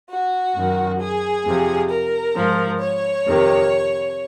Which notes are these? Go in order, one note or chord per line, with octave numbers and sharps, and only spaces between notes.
F#4
F#2 D#3
G#4
F2 C3 F3
A#4
G#2 F3
C#5
F2 C3 D#3